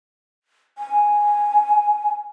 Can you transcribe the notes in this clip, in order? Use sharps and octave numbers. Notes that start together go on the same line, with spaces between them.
G#5